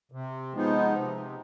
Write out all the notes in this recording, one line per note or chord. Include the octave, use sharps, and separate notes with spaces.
C3
F3 G#3 B3 D#4
C3